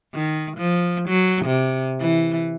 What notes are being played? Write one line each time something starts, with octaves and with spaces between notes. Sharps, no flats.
D#3
F3
F#3
C3
E3